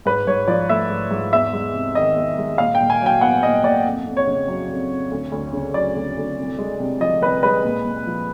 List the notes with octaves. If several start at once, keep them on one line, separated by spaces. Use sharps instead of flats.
G#2 B4
G#2 C#5
F3 D5
A3 E5
G#2
G#2
E2 E5
G#3
C3
D#3 D#5
E2
G#3
A#2 F5
G5
A#2
G#5
F#3 G5
B3 F#5
A#2 D#5
A#2 D5
F2
F2
C#5
C#3
F#3
F2
F2
D2
D2
C#3
F#3 D5
D2
D2
C2
G#3
C3
F3 D#5
C2 B4
G#3 B4
A#2
A#2
F3